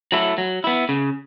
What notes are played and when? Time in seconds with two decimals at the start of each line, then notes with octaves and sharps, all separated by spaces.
0.12 F#3 A3 E4
0.38 F#3
0.64 B3 E4
0.89 C#3